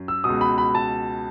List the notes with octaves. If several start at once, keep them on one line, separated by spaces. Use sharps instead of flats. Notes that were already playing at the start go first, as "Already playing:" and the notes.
Already playing: F#2
E6
C#2 B2 D#6
B5
B5
A5